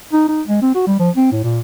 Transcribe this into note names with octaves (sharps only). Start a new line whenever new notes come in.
D#4
D#4
G#3
C4
F#4
G3
F3
C4
A2
A#2